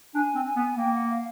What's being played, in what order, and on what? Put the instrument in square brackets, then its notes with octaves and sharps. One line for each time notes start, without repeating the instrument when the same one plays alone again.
[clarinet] D4 [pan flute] G#5
[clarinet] C4
[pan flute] G#5
[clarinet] B3
[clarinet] A#3 [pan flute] G5
[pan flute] F#5
F5